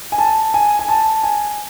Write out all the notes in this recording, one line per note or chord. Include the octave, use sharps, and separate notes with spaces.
G#5
A5
G#5
G#5
A5
G#5